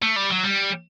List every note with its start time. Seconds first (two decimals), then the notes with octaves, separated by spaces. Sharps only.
0.02 A3
0.16 G3
0.30 F#3
0.43 G3